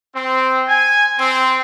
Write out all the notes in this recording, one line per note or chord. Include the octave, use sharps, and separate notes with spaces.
C4
G#5
C4